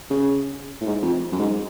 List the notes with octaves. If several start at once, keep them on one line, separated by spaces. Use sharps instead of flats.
C#3
A2
G#2
F2
F#2
G#2